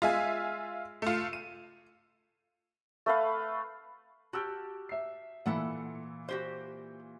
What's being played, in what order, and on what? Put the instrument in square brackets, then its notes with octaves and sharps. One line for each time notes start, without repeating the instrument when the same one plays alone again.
[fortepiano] G#3 F5 [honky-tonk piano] F4 E5 G#5
[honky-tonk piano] A3 F4
D#7
[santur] A3 B4 F5
[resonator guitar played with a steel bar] F#4 G4 [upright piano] A5 E6 F6
[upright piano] E5 C7
[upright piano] A#2 E3 [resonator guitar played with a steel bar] E4 A4 F#5
[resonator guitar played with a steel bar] F#4 G4 C5